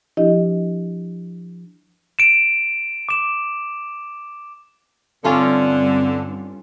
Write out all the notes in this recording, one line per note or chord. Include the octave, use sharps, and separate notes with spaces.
F3 D4 E4 G4 D#5
D7 E7
D6 E7
G2 D3 C4 C#4 F4 A4